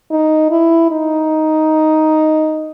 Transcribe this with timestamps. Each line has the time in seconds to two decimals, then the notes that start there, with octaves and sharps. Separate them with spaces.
0.11 D#4
0.51 E4
0.91 D#4